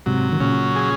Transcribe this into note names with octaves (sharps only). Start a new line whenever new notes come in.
G#2 C3 F#3
D#3
A#2 C#3 C#4
G#4